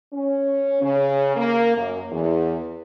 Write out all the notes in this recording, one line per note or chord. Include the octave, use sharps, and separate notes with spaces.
C#4
C#3
A#3
F#2
E2